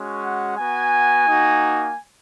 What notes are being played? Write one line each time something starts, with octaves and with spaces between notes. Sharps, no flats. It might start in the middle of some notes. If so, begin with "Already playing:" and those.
Already playing: G#3 C#4 F#4
F#5
B3 F#4 G#5
A#3 D#4 F#4